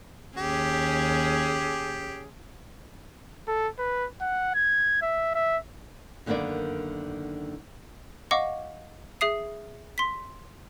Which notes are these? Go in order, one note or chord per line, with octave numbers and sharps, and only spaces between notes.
D#2 C#4 G4 G#4
A4
B4
F#5
G#6
E5
E5
F#2 D3 D#3 A#3 B3 D5
D#5 F5 F#5 C#6 D6
G#4 E5 D#6 C7
C6 B6